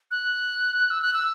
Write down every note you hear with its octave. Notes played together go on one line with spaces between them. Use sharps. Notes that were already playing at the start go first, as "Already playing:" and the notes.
F#6
E6
F#6
E6